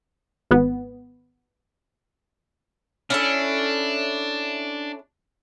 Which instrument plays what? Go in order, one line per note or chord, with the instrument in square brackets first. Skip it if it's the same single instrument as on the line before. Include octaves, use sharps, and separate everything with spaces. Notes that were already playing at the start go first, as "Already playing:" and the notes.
[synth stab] G#1 B3
[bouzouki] C#4 E4 A4 [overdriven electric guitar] D4